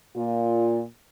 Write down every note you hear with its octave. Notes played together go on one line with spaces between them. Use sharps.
A#2 F4